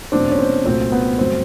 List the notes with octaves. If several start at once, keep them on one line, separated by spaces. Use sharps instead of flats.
E2 B2 F#3 A3 C4 D4
C#4
C4
C2 A#2 F#3 A3 C4
B3
G2 D3 F#3 A3 C4